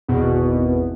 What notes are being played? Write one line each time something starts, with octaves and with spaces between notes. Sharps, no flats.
G#1 E2 B2